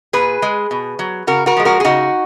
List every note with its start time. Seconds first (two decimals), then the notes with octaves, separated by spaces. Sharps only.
0.13 A#2 G#4 B4
0.42 G#3
0.71 B2
0.99 F#3
1.27 C#3 F#4 A#4
1.46 F#4 A#4
1.57 F3 G#3
1.65 F#4 A#4
1.80 G#4
1.85 C#3 D#4 F#4